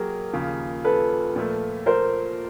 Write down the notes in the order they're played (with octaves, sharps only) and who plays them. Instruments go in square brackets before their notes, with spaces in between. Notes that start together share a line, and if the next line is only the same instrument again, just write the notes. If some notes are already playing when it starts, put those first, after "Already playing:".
Already playing: [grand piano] F#3 A#3 G4 [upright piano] G#4 A#4
[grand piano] D#2 C#3 F3
[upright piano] A4 B4
[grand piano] A#2 F3 A3
[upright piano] A#4 C5